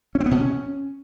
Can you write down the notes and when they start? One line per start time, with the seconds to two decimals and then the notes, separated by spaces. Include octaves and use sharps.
0.15 C#4
0.20 C4
0.26 B3
0.31 B2
0.37 C#4